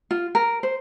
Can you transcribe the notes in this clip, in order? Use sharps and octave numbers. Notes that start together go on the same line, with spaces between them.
F4
A#4
C5